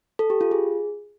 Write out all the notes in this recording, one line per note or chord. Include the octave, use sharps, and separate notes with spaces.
A4
G4
F4
G#4